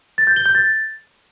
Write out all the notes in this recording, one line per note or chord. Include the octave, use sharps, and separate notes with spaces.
A6
G6
G7
G6
A6